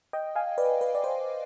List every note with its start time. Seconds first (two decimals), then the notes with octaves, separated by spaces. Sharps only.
0.13 D#5 G5
0.35 F5 G#5
0.58 B4 D5
0.81 B4
0.95 D5
1.04 C5